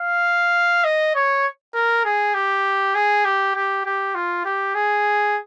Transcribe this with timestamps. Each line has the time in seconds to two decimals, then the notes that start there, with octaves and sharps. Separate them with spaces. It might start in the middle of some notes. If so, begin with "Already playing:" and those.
Already playing: F5
0.84 D#5
1.15 C#5
1.74 A#4
2.05 G#4
2.34 G4
2.95 G#4
3.25 G4
3.55 G4
3.85 G4
4.15 F4
4.45 G4
4.75 G#4